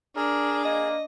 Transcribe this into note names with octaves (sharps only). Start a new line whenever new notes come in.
D4 G#4 A#4
A#3 D#5